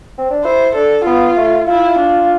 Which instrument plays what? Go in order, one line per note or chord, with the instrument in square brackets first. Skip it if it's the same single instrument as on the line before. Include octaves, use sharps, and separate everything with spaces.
[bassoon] C4
D4
[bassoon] E4 [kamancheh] C5
[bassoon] D4 [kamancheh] A4
[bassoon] B3 [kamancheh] F4
[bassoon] A3
[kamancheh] E4 [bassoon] F4
[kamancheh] D4